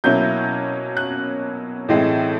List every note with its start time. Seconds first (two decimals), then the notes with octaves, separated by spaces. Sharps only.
0.04 B2 F#3 A#3 C#4 E4 G6
0.97 F#6
1.88 A2 E3 G#3 C4